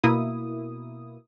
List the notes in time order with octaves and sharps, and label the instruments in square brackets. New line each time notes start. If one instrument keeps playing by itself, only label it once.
[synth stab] B2 A#3 E4 D#6